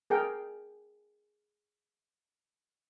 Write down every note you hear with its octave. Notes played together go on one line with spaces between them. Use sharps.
G#4 A#4 G5